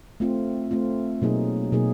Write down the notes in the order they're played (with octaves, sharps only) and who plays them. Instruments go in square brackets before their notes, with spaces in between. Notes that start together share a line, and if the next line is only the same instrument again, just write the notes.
[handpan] A3 C4 F4
A3 C4 F4
B2 F#3 A#3 D#4 G#4
B2 F#3 A#3 D#4 G#4